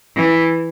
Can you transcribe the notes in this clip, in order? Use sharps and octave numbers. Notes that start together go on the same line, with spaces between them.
E3